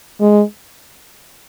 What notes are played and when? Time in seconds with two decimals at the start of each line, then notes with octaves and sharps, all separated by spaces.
0.21 G#3